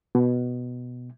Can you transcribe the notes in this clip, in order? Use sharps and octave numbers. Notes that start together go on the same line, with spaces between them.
B2